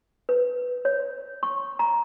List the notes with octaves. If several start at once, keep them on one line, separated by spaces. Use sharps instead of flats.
B4
C#5
C#6
A#5